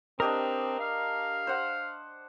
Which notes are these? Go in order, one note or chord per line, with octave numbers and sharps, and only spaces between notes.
C4 D4 G4 A#4 D#5
F5
C5 F#5